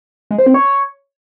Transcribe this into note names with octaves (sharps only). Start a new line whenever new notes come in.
G#3
C5
C4
C#5